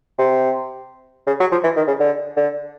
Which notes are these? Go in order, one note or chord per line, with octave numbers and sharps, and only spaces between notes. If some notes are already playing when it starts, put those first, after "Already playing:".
C3
C#3
F#3
F3
E3
D#3
C#3
D3
D3